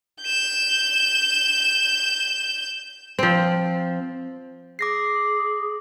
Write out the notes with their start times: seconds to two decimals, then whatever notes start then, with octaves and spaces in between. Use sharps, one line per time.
0.22 G6 E7
3.19 F3 C4
4.79 G#4 D6 A#6 C7